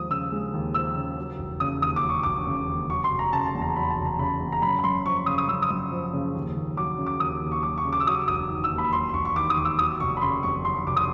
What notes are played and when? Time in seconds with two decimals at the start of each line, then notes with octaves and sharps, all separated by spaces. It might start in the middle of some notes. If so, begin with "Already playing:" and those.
Already playing: D#2 F3 G#3 D#6
0.10 C#3 E6
0.32 G#3
0.54 D#2
0.74 F3 E6
0.96 C#3
1.17 F#3
1.39 E1
1.60 C#3 D#6
1.82 D#2 D#6
1.96 D6
2.03 F#3
2.09 C#6
2.23 E1 D6
2.47 C#3
2.68 D#2
2.89 F#3 C#6
3.04 C6
3.12 F1
3.19 A#5
3.33 C#3 A5
3.47 A5
3.55 E2
3.62 A#5
3.76 F#3 B5
3.90 A5
3.97 F1
4.05 A#5
4.19 C#3 B5
4.40 E2
4.52 A#5
4.62 F#2 B5
4.79 B5
4.83 F#2 C6
5.05 F3 C#6
5.26 C#3 D#6
5.38 D#6
5.48 F#2 E6
5.62 D#6
5.70 F#2
5.92 F3
6.13 C#3
6.35 D#2
6.56 D#2
6.77 F#3 D6
6.98 C#3
7.06 D6
7.20 D#2 D#6
7.42 D#2
7.51 C#6
7.63 F#3 D6
7.78 C#6
7.85 C#3
7.93 D6
8.00 E6
8.06 F#3 D#6
8.28 E1 D#6
8.50 D#3
8.64 E6
8.71 D#2
8.78 B5
8.92 F#3 C6
9.09 C6
9.14 E1 C#6
9.25 C#6
9.36 D#3 D6
9.50 D#6
9.57 D#2
9.65 E6
9.79 F#3 D#6
10.00 F1 C#6
10.17 B5
10.22 C#3 C6
10.43 F2 C#6
10.65 F#3 C6
10.75 C#6
10.86 F1 D6
10.96 D#6